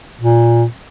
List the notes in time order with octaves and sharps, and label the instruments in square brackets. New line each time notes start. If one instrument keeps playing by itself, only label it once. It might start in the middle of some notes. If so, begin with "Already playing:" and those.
[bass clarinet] A#2